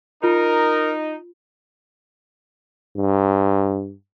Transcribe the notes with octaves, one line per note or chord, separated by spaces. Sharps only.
D#4 F4 A#4
G2